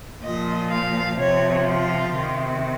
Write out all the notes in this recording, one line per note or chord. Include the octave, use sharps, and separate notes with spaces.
A#2 F3 D#5
F5
C3 F3 C#5
F4
C3 D#3